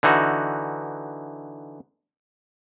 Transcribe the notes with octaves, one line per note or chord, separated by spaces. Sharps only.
D3 E3 D#4 F#4